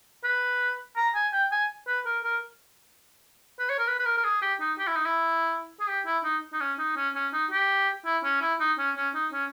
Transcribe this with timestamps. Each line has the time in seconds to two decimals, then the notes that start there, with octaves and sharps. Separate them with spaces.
0.24 B4
0.97 A#5
1.15 G#5
1.33 G5
1.51 G#5
1.88 B4
2.06 A#4
2.24 A#4
3.59 B4
3.69 C#5
3.79 A#4
3.87 B4
3.99 B4
4.05 A#4
4.18 A#4
4.24 G#4
4.42 G4
4.60 D#4
4.78 G4
4.87 E4
4.96 D#4
5.05 E4
5.80 G#4
5.88 G4
6.06 E4
6.24 D#4
6.53 D#4
6.60 C#4
6.78 D#4
6.96 C#4
7.15 C#4
7.33 D#4
7.51 G4
8.05 E4
8.24 C#4
8.42 E4
8.60 D#4
8.78 C#4
8.97 C#4
9.15 D#4
9.33 C#4